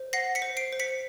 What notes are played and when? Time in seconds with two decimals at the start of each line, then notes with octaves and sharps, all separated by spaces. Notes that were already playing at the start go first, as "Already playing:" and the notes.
Already playing: C5
0.13 F#5 A#6 C7
0.35 B6 C#7
0.42 C5
0.57 C7 D7
0.72 C5
0.80 B6 C#7